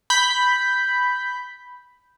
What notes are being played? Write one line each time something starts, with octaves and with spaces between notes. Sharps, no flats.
B5 G6